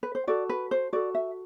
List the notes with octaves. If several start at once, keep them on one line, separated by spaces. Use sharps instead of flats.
B4
C5
F#4 A4 D5
B4
C5
F#4 A4 D5
E5